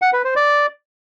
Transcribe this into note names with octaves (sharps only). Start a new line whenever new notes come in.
F#5
B4
C5
D5